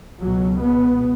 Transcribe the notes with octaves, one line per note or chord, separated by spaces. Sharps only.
C#2 B2 F#3
B3